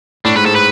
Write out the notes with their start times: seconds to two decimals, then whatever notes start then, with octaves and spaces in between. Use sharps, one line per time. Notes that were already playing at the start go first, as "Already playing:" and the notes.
0.24 A2 D4
0.35 G#2 B4
0.46 G#2 A4
0.55 B4